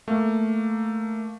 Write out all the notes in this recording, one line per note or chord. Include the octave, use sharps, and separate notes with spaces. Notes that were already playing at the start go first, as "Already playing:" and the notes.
A3 A#3